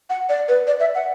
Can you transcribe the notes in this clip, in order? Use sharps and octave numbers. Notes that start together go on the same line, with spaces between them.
F#5
D5
B4
D5
E5
F#5